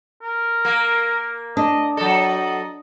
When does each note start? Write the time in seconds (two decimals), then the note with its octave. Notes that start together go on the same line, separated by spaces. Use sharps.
0.22 A#4
0.65 A#3
1.57 D4 D#5
1.97 F#3 A4 D#5